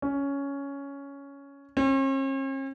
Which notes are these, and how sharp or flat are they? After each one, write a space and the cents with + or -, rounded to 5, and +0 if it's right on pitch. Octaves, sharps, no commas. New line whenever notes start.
C#4 +10
C#4 -45